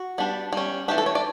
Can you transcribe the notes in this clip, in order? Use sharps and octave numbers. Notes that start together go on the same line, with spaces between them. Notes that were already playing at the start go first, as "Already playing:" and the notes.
Already playing: F#4
G3 B3 D4
G3 C#4
E3 A3 D4 G4
A4
C#5
D5